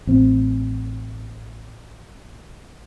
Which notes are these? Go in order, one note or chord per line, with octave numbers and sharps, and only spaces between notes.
A1 C4